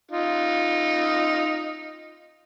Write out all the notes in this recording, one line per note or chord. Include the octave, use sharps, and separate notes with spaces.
D#4 F4